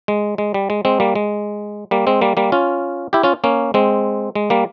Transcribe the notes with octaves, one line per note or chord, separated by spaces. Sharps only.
G#3
G#3
G3
G#3
G#3 C4
G3 A#3
G#3
G3 A#3
G#3 C4
G3 A#3
G3 A#3
C#4 F4
E4 G4
C#4 F4
A#3 C#4
G#3 C4
G#3
G3 A#3